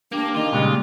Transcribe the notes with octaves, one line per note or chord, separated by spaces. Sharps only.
A#3 D4 G4
D#3 F4
A#2 C#3 G3 G#3